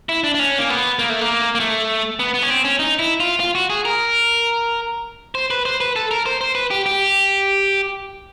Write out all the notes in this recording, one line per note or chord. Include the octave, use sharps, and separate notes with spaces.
E4
D4
D4
C#4
A#3
B3
A#3
A3
A#3
A#3
A3
B3
B3
C#4
C4
C#4
D#4
E4
F4
F4
F#4
G#4
A#4
C5
B4
C5
B4
A4
A#4
C5
C5
B4
G4
G4